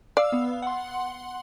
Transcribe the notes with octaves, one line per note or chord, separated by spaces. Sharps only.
D5 F5 E6
B3
F#5 C6